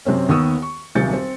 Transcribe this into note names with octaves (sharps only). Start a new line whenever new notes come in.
F#2 C3 C4 C#4
D#2 D#3 B3 C#6 D#6 E6
C#6
D#1 B1 C3 G6 A6 C#7
C4